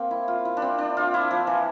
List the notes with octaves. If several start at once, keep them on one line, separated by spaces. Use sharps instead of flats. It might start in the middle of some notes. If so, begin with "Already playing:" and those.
Already playing: A#3 C4
E4
F4
E4
D4
C4
D4
F4
E4
F3
E3